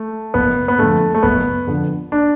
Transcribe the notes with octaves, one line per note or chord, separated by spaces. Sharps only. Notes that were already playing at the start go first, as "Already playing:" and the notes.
Already playing: A3
F#1 B3
B3
F2 D3 A3
A3
F#1 B3
F2 D3
D4